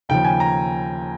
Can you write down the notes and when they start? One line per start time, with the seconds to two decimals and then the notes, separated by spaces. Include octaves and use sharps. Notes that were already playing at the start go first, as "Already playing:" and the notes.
0.09 D#2 C#3 F3 G5
0.25 G#5
0.40 A#5